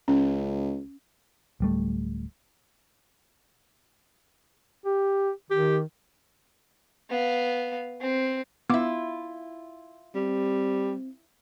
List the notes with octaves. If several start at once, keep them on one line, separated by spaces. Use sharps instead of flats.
C#2 C#4
D1 G3 A3
G4
D#3 G4
B3 F5
C4
B3 E4 F4 D6
G3 C4